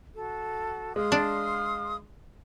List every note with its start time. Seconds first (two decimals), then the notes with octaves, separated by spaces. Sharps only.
0.15 F#4 A4
0.96 G#3 F5 C6 D#6
1.12 D4